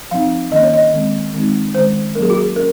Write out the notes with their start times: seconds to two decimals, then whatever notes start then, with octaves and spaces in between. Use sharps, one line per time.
0.11 F3 C4 D#4 F5
0.52 D#3 A#3 C#4 D#5
0.63 C#5
0.74 D#5
0.93 D#3 G#3 C4
1.34 D#3 G#3 C4 D#4
1.75 D#3 G#3 C#4 C5
2.15 F#3 A#3 C#4 A#4
2.22 G#4
2.30 F#4
2.37 G#4
2.56 C#4 A#4